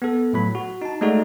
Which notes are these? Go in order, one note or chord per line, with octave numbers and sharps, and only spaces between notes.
B3 A4
A2 F#3 B5
F#4
D#4 A5
G#3 A3 D#4 F#4 A4 D5